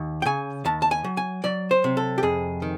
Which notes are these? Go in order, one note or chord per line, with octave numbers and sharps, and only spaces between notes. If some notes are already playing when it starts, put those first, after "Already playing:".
Already playing: D#2
G5
C#3 G#5
D#2 A5
A5
G#5
F#3
G#5
F#3 D5
C5
C3
A4
G4
F2 G#4
D#3